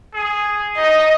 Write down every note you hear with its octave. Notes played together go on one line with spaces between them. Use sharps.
G#4
D#4 D#5